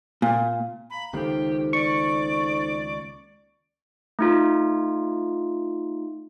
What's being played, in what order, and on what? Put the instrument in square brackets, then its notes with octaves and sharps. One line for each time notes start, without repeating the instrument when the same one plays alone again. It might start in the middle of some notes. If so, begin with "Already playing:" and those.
[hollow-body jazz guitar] A#2
[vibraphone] F5 A#5 [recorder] B5
[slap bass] C#2 D#3 A#3 [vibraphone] D#4 A4 C5 [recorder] G4
[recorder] D5 [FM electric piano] C#6
[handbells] A3 D#4 F4